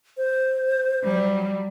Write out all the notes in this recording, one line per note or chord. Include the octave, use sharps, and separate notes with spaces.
C5
F#3 G3